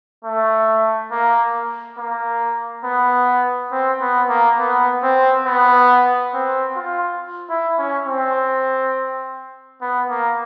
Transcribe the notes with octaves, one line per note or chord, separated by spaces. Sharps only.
A3
A#3
A#3
B3
C4
B3
A#3
B3
C4
B3
C4
F4
E4
C#4
C4
B3
A#3